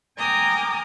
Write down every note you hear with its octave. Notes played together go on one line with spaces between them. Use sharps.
G5 G#5 A#5 D6 D#6 F6